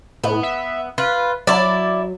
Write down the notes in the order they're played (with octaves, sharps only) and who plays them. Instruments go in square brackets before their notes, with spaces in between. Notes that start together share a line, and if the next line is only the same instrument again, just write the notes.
[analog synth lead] A2 [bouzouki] B3
[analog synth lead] E5
[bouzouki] F4 [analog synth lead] B4
[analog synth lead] F#3 [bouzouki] E4 D5